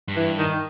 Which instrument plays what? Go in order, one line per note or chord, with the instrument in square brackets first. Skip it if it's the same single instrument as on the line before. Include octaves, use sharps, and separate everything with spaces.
[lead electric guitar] G2
[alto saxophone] E3
D#3